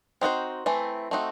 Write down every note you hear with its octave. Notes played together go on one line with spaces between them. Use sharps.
C4 D#4 F#4 C5
E3 A3 C4
A3 C4 D#4 F#4